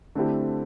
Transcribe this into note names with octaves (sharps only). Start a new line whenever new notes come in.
D3 A3 C4 E4 G4